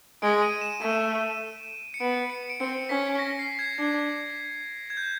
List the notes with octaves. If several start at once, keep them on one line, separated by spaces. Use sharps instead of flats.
G#3 D7
D#7
E7
A3 D#7
C#7
B3 D7
C#7
D7
C4 C#7
C#4 B6
A#6
C7
G#6
D4 G#6
G#6
G6